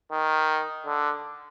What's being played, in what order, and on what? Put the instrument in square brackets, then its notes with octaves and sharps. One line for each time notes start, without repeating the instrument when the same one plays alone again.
[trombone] D#3
D3